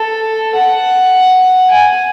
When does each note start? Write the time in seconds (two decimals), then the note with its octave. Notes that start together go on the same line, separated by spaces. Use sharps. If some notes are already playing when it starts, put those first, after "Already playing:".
Already playing: A4
0.55 F#5
1.70 G#5